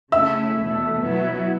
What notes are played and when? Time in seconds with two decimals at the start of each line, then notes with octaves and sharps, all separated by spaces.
0.12 C#3 A3 C#4 E4 E5 E6
0.58 E2 B2 A3
1.03 B2 F#3 B3 E4